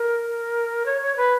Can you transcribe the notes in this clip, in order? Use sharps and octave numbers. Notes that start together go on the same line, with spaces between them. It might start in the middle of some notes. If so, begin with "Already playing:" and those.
Already playing: A#4
C#5
C#5
B4